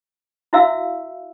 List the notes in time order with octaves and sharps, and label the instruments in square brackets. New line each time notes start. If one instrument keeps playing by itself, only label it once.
[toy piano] E4 F#4 E5 F5 E6